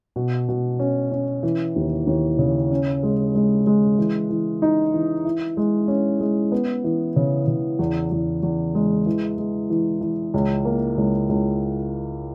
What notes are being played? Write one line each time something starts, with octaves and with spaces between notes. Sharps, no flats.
B2
B2
C#4
C#4
E3
D#2
D#2
C#3
C#4
G#3
G#3
G#3
E3
E3
D#4
E3
E4
G#3
C#4
G#3
B3
E3
C#3
C#3
E2
E2
E2
G#3
E3
G#3
E3
E3
C#2
A#3
C#2
C#2